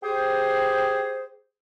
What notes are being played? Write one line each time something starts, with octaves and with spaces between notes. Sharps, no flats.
G4 G#4 C5